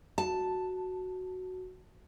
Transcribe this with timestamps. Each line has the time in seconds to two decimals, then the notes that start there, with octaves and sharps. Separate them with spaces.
0.18 F#4 A5